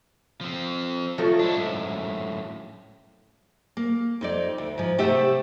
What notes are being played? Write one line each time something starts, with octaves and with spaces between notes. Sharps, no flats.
F3 C4
F3 F#3 A3
G#2 D4 E4
F#2 A2
A#3
F2 D#4 D5
D2
G#2 F3
C3 A3 G4 E5 F#5